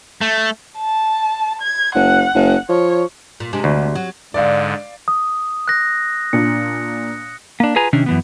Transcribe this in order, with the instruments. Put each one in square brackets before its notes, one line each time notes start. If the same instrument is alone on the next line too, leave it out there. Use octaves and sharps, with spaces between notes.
[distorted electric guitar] A3
[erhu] A5
G#6
[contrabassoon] F#1 [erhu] F#5
[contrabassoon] F#1
[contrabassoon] F3 [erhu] C#5
[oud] A#2
C3 G#3 D4
[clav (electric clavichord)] D2
[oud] F#3
[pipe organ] G#2 D3 [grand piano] D5 F5
[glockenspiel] D#6
F#6 A#6
[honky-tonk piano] A#2 D4 [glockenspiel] C#7
[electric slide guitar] A#3 D4
F4 G#4 B4 G#5 A#5
C3 D#3 C#4 D4
F#2 E3 B3